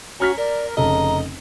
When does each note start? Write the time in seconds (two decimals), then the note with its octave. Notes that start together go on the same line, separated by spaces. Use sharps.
0.20 C#4 F#4 A#5 F6 B6
0.38 A#4 D5
0.77 F1 C#3 A4 D#5 A#5